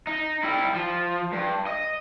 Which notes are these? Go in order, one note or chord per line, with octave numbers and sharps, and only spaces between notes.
D#4
G3 E4
F3
G2
D#5